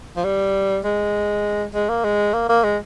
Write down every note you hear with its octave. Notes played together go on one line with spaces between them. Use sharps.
F3
G3
G#3
G#3
A#3
G#3
A#3
A#3
G#3